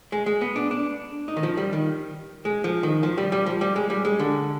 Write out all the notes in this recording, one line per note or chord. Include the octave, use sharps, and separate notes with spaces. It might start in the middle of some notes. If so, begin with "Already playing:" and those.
G#3
G#3
B3
D4
D4
D#4
D#3
F3
G3
D#3
G#3
F3
D#3
F3
G3
G3
F3
G3
G#3
G3
G#3
D3